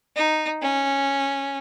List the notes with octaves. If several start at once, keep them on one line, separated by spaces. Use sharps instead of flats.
D#4
C#4